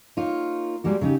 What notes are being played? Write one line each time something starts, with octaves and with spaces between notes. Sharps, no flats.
A#3 D#4 F4 C#5
G3 G#3 A#3 F#4
C#3 F#3 D#4 G4